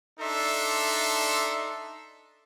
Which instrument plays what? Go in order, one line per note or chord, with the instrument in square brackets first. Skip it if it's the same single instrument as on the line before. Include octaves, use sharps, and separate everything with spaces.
[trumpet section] D4 D#4 A4 E5 C6